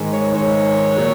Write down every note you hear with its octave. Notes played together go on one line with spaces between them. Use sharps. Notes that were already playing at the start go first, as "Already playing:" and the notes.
Already playing: G#2 D#3 G#3
C#5
G#2 D#3 G#3 C#5
A#2 F#3